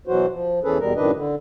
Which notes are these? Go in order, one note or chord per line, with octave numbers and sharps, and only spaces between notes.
B2 E3 F#3 F#4 C5
F3
E2 E3 C#4 G#4 A4 B4
E2 B2 G3 A#4
F#2 A2 D#3 D4 B4 D#5
D3